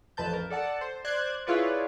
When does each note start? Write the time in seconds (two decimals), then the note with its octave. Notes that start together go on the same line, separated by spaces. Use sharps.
0.17 A1 F2 B4 A5 G6
0.33 A#4
0.50 A4 D5 F#5 A5
0.81 C5
1.05 C5 D5 F#6 G#6
1.47 E4 F4 G#4 B4 C#5 D5